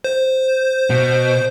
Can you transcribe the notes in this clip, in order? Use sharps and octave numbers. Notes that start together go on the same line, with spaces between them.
C5
B2